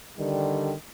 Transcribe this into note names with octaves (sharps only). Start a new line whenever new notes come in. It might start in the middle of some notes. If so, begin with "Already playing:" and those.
D3 D#3 G3